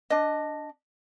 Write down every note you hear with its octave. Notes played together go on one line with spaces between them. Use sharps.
D4 D#5